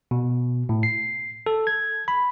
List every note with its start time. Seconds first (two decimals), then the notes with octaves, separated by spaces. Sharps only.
0.11 B2
0.69 A2
0.83 C7
1.46 A4
1.67 G#6
2.08 B5